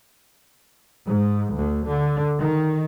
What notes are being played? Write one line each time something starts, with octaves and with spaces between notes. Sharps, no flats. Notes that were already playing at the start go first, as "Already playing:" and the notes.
G#2
D2
D3
D#3